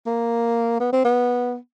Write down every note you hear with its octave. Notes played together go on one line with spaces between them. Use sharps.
A#3
B3
C4
B3